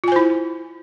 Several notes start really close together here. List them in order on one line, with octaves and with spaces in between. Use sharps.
F4 G#5 C5 E4